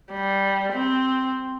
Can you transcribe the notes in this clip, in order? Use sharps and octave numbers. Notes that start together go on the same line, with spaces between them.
G3
C4